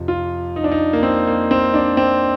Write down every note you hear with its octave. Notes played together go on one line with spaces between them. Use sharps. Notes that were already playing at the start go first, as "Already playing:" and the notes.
Already playing: F2 C3 F3
F4
D#4
D4
D#4
A#3
C4
A#3
C4
D4
C4